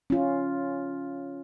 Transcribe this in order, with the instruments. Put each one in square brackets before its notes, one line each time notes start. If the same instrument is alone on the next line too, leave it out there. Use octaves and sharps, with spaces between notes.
[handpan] C#4 F4